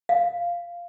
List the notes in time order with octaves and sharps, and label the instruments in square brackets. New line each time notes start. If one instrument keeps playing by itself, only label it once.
[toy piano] F5